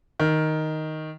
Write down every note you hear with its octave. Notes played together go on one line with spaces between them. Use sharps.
D#3